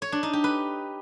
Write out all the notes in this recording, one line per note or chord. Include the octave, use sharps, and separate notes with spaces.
C#5
D4
D#4
G4
B4